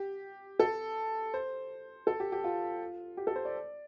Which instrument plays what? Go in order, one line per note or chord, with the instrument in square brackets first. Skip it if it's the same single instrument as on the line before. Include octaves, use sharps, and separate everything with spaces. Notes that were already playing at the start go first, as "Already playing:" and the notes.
Already playing: [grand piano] G4
A4
C5
A4
G4
G4
F4
G4
A4
C5
D5